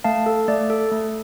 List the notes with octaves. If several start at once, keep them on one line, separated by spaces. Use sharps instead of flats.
A3 F5 A5
A4
A3 D5
A4
A3